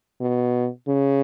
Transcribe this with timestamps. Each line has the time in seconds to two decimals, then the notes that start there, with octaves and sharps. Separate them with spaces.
0.21 B2
0.88 C#3